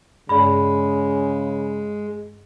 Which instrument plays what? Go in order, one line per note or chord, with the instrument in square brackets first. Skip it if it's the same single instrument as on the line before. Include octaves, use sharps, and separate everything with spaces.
[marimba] G2 G#4 [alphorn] C#3 [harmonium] G#3 [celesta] D5 B5